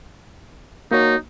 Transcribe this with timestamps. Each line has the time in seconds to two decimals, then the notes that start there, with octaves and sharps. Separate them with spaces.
0.91 A#3 D#4 F#4 C#5